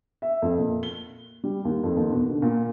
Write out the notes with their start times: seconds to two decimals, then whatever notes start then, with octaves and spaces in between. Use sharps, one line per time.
0.22 E5
0.42 F2
0.58 A#2
0.83 G7
1.44 G3
1.65 D#2
1.83 F2
1.97 D#2
2.12 B2
2.30 D3
2.42 A#2